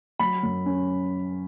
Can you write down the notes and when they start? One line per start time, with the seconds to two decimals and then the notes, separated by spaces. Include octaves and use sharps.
0.19 F#3 B5
0.43 F#2
0.66 C#4